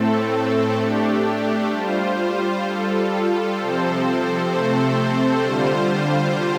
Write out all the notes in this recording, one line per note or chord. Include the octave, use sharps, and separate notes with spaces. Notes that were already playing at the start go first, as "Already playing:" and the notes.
Already playing: A2 A3 C4 A4
A3 D4 G4
G3 F4 C5
G3 F4 A4
C3 F3 C4 A4 C5
C3 A3 C4 A4 C5
D3 G3 F4 C5